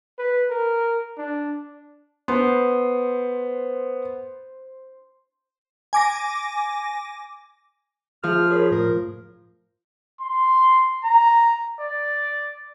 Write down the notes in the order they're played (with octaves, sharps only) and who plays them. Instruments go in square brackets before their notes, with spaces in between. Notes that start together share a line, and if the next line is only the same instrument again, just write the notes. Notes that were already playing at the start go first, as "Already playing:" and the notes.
[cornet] B4
A#4
D4
[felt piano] B3 [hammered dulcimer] C5
[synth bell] G#5 D6 A#6
[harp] F3 [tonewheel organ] G#4 [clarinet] F6
[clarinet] G#4 [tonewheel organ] A#4 C#5 B5
[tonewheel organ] A2 [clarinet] A#4
[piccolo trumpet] C6
A#5
D5